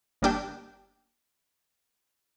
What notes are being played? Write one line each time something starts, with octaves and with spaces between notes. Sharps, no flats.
G1 G3 A#3 D4 G4 G5